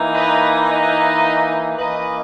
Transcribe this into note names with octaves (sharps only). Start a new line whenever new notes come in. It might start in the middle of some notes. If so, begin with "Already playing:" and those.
Already playing: E3 A#3 D#4
B4 D#5
B4 D#5
E3 A#3 C#4 B4 D#5